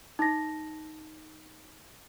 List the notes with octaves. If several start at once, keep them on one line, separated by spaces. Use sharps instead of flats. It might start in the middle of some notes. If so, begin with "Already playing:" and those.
D#4 A#6